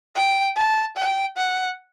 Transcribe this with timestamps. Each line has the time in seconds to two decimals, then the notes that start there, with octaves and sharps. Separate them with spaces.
0.15 G5
0.57 A5
0.97 G5
1.37 F#5